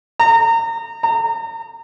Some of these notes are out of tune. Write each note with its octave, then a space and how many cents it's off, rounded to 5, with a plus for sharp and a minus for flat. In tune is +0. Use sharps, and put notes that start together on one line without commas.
A#5 -30
A#5 -35